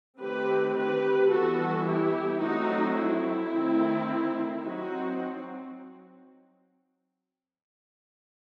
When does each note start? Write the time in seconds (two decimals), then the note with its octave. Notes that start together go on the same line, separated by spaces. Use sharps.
0.20 D#3 A3 C4 G4 B4
0.76 G4 B4
1.31 E3 G3 B3 F#4 A4
1.87 E4 G4
2.42 F#3 A3 C4 D#4 F#4
2.98 E4
3.53 D#3 A3 C4
4.64 F#3 C4 D#4 F#4